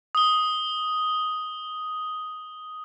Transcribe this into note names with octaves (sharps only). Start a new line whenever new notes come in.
D#6 G7